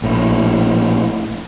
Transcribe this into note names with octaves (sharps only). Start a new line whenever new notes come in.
A#1 A2